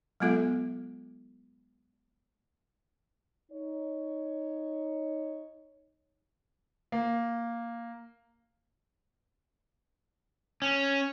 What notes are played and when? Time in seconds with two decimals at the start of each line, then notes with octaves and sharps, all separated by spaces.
0.20 F#3 G#3 B3 F4 A4 E5
3.52 D#4 C#5
6.92 A#3
10.62 C#4